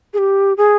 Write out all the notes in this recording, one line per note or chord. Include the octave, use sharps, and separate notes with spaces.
G#4
G4
G#4